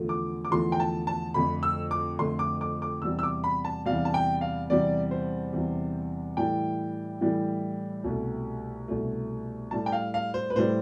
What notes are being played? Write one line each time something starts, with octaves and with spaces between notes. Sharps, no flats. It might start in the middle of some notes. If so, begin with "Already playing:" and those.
Already playing: E2 D3 F3 A3
D6
D6
E2 D3 F3 A3 C6
G5
A5
A5
F2 D3 A3 B5
E6
D6
F2 D3 A3 C6
D6
D6
D6
E2 C3 G3 E6
E6
D6
B5
A5
E2 C3 G3 F5
A5
G5
F5
E2 C3 G3 D5
C5
E2 C3 G3
A2 E3 G3 G5
A2 E3 G3
C2 B2 A3
C2 B2 A3
A2 G3 A5
G5
F5
F5
C5
B4
A2 G3 C5